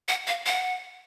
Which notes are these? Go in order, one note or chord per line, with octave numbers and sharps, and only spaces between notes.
F#5
F5
F#5